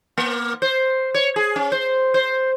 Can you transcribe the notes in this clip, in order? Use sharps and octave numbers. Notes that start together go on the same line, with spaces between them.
A#3
C5
C#5
G#4
C#4
C5
C5